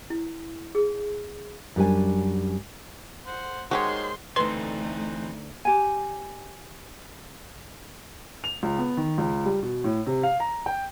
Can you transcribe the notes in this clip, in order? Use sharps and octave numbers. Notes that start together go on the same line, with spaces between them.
E4
G#4
F#2 G3 D4 G#5
C5 F#5
D#3 G#3 F#4 G4 C5 C#5 C6
D2 E3 A3 C4 D#4 B4 C6
G4 G#5
F7
C#2
B3
D#3
C#2
G3
B2
A2
C3
F5
A#5
G5